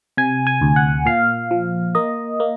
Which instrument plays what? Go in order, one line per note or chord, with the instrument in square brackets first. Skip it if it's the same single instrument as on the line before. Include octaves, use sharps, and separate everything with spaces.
[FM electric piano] C3 G#5
G#5
D2
F#5
A#2 F5
F3
A#3 D#5
A#3